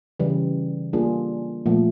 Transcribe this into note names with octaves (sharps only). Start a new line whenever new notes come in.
C#3 E3 G3
G3 A#3 D4 F4 G#4
A#2 F3 A3